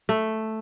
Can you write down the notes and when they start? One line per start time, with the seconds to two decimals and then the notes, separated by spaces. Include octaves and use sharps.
0.09 A3